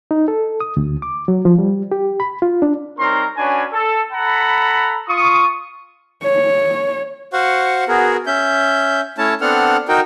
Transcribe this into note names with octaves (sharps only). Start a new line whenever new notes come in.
D#4
A4
D#6
D2
D6
F#3
F3
G3
G4
B5
F4
D4
G3 C4 D#4 A#4 C#5 C6
C#4 D4 F#4 B4 C#5 G#5
A4
A4 F#5 A#5 B5
F4 C#6 D#6
C#5
F#4 C5 F5 F#5 C#6
B3 F#4 G#4 A#4
C#4 E5 G6
A3 C#4 E4 C#5 A5
B3 C4 D4 A4 F#5 F6
D#4 F#4 A#4 G5